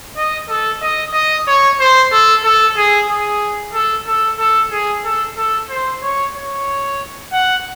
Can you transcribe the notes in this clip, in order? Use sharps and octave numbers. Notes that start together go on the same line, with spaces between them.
D#5
A4
D#5
D#5
C#5
C5
A4
A4
G#4
G#4
A4
A4
A4
G#4
A4
A4
C5
C#5
C#5
F#5